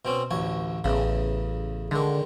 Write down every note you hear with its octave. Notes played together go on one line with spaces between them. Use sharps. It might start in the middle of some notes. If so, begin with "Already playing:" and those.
B2 C4 C#4
A1 D2 C#5
A1 E2 C#3
D3 D#3 G#3